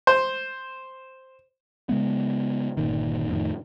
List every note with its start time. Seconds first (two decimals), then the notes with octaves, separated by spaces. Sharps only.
0.07 C5
1.89 C#3 G#3 B3
2.77 G1 A#2 D#3
3.29 F2 A2 D#3